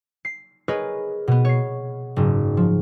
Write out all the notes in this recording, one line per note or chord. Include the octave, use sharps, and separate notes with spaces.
C7
G#4 A#4 B4 C#5 D#5
B2 B3
C#5 C7
F#1 G#2
F3